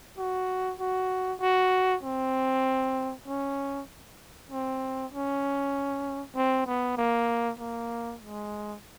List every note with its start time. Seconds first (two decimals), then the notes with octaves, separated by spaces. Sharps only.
0.18 F#4
0.79 F#4
1.40 F#4
2.03 C4
3.27 C#4
4.50 C4
5.12 C#4
6.35 C4
6.66 B3
6.97 A#3
7.59 A#3
8.21 G#3